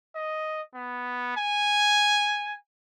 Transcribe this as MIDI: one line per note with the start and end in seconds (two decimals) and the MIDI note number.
0.15 0.61 75
0.75 1.36 59
1.37 2.54 80